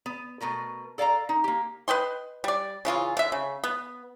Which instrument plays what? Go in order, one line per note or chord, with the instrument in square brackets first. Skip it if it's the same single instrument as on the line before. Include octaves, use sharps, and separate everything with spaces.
[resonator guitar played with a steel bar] B3
B2 A3 A#4 B4
A4 D5 F5 A5 A#5
D#4
A#3 G4
[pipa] B4 D#5 G5 C6
G3 D5
C#3 E3 F4 G#4
D3 E5
C#3
B3